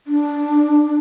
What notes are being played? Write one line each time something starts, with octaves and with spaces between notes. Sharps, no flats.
D4